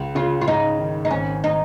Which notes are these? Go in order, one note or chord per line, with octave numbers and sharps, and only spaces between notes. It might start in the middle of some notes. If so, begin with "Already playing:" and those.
Already playing: C#2
C#3 F4
F4
G#2 D#4
D#3
D#4
G#1 C#4
D#4